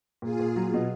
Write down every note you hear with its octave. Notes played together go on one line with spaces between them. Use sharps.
A#2 F4 G#4
A#2
F#3
B2